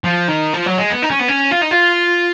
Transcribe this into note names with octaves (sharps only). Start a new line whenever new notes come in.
F3
D#3
F3
F#3
G#3
B3
D#4
C#4
B3
C#4
F4
D#4
F4